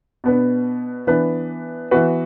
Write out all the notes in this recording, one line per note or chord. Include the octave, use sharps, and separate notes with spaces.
B2 B3 D4 B4
E3 B3 D4 B4
E3 B3 F#4 B4